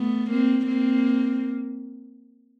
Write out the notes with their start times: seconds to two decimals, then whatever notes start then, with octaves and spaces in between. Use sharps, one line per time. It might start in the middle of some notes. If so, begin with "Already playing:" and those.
Already playing: A3 B3
0.30 A#3 C4
0.67 A#3 C4